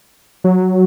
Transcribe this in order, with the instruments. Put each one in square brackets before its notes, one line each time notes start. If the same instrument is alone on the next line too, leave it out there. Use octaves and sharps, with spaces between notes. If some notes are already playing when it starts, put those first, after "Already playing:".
[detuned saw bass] F#3